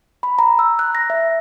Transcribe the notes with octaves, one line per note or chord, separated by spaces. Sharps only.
B5
A#5
E6
F#6
A#6
E5